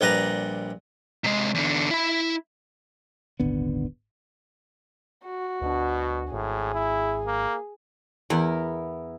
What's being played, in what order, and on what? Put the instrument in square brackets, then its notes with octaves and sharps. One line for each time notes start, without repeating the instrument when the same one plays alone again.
[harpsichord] A#1 G3 B4 A#5
[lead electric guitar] C3 G#3
E2 D3
E4 B5
[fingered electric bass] D#1 G#1 D3 B3
[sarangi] F#4
[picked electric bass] D2 D4 [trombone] B2
[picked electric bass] G#1 [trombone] A2 [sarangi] G#4
[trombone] E4
A#3
[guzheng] E2 [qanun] B3 E4 A#4